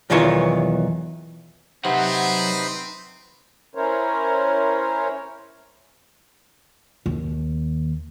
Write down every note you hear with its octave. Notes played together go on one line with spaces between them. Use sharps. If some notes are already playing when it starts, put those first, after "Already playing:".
B1 E2 D#3 E3 F4 C#5
C3 F#3 C4 D#4 B4 C5 F#5
C#4 E4 A#4 C5 C#5
D#2